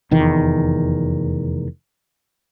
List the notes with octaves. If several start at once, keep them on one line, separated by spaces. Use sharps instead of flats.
F1 E2 D#3